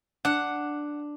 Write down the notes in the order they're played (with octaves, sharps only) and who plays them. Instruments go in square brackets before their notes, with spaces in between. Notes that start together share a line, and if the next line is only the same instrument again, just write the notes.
[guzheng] D4 [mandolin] F#5